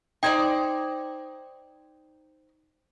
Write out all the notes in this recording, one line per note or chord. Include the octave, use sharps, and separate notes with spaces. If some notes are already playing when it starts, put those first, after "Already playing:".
D#4 C5 D5 G5 G#6